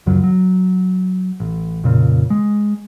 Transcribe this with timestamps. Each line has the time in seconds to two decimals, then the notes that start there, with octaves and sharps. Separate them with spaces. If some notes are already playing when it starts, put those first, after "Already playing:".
0.06 C#2 F#2 C#3 F#3
0.23 F#3
1.40 A1
1.84 F2 A#2 C#3
2.30 G#3